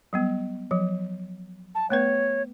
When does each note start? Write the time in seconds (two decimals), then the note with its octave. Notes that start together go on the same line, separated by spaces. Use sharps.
0.13 F#3 G3 B3
0.71 F3 F#3
1.75 A5
1.90 A3 B3 B4 C#5